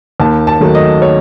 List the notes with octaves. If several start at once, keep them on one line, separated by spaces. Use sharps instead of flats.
D#2 A5
A5
D#3 F#3 A3
D#5
C#5